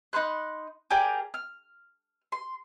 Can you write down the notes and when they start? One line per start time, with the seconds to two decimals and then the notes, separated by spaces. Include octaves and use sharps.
0.13 D#4 B5 C6 F#6
0.90 G4 G#4 A#4 D5
1.34 F6
2.32 C6